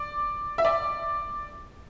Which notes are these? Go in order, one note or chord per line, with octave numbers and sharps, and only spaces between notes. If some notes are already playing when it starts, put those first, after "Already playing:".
Already playing: D5
E5
D5